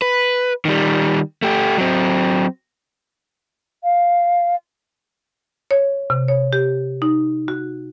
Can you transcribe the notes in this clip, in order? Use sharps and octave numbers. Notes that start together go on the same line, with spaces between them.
B4
D#3 G3
A3 G4
F#3 C4
F5
C#5
C3
C#5
G4
D#4
F#4